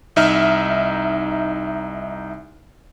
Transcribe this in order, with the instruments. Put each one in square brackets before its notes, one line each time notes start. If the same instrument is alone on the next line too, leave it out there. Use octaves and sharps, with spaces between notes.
[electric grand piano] C2 D#4 E5 F6